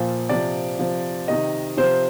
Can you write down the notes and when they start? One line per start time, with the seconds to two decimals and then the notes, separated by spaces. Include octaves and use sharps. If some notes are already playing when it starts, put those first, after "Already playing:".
Already playing: A#2 F3
0.29 C3 F3 D5
0.79 C3 F3
1.28 C3 D#3 D#5
1.77 C3 F3 C5